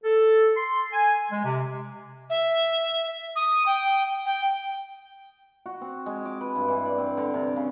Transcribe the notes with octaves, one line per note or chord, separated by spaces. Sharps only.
A4
C6
G#5
G#3
C3
E5
D#6
G5
G5
F#4
C4
G#3
D6
B4
G2
E3
D5
C4
D3
C3
C#3